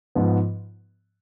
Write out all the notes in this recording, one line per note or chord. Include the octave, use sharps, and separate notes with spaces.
G#2 F3 B3